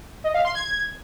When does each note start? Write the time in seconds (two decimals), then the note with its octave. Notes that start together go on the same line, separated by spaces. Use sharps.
0.24 D#5
0.34 F5
0.45 C6
0.55 G#6